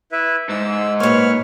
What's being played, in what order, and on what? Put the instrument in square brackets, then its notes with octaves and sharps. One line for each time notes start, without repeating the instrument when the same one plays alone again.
[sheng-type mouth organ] E4 B4 E5
[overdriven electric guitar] G#2 [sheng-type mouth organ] E6
[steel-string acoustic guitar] A#2 A#3 [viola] B4 C#5 [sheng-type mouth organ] F6